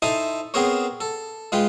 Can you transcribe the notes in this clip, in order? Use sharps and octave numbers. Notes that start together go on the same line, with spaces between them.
D#4 E4 A4 C5 G#5 D#6
B3 C4 G#4 A#4 C5 C#5
A4
G#3 F4 B4 G5